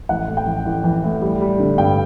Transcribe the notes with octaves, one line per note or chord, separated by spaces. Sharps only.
A1 F#5
A2
G5
A1
A1
E3
A2
G3
G3
D3
G2 G5